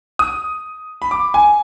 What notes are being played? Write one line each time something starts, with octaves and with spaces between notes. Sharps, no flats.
D#6
B5
D6
G#5